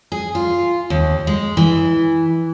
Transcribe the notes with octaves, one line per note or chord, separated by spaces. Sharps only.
G#4
F4
D#2
G#3
E3